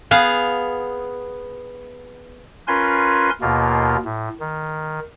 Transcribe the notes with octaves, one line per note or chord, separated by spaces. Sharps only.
B3 G#4 F5
C#4 F4 A#4 B4 G#5 C6
D#2 B2 A#3 F4
A2
D#3